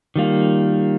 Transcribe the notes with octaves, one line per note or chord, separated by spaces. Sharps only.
D#3 G3 A#3 F4